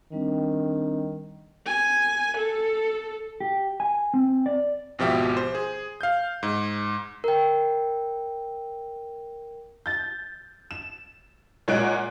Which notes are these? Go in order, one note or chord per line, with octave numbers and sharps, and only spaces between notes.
D#3 G3 C4 D4
G#5
A4
G4
G#5
C4
D5
G#1 B2 F3 G4 E5
C5
G#4
F5 G6
G#2
A#4 G5
G6 A6
E7
A#2 G#3 C#5 F#5 F#6 D7